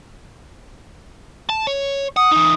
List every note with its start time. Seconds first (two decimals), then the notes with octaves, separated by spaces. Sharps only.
1.50 A5
1.67 C#5
2.17 F#5 D#6
2.32 E3 D#4